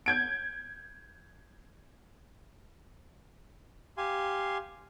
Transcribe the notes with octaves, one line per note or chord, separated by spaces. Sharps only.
G6 G#6 D7
G4 F5 G#5 C6